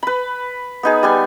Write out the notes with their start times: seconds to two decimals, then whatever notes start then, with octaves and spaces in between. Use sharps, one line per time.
0.03 B4 B5
0.83 B3 D#4 G#4
1.03 G3 B3 G#5